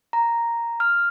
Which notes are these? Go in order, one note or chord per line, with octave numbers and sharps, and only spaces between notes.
A#5
F6